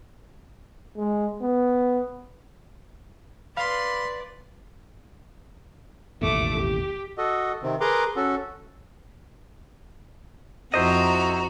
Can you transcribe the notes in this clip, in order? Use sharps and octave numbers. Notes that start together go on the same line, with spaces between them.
G#3
B3
B4 D5 F5 B5 C6
E1 A1 D#2 A3 D6
G4
F#4 A4 D#5
C3 D#3 C4
G#4 A#4 B4 A#5 C6 D6
C#4 F#4 A4
F2 E4 F#4 C5 D#5 A#5